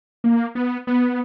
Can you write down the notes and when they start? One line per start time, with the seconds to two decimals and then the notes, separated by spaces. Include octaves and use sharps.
0.24 A#3
0.55 B3
0.87 B3